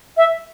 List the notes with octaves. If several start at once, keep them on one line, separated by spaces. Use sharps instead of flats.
E5